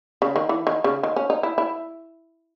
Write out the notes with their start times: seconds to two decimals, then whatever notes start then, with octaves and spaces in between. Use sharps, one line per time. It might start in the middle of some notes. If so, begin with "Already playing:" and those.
0.22 C#3
0.36 D#3
0.49 E3
0.67 D#3
0.84 C#3
1.03 D#3
1.16 C#4
1.30 D#4
1.43 E4
1.58 E4